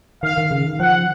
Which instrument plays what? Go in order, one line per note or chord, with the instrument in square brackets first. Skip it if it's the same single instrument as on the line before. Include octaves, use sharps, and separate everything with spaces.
[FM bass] D#3 [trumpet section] F5
[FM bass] D#3
C#3
D#3
[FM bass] F3 [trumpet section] F#5